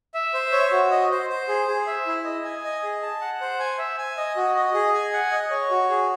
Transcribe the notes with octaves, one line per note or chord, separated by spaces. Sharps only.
E5
C5
C#5
F#4
D#5
C5
C5
G#4
G#4
E5
E4
D#5
G#5
D#5
G#4
A5
F#5
C5
G#5
E5
G#5
D#5
F#4
D#5
G#4
G#5
F#5
D#5
C#5
F#4
G#4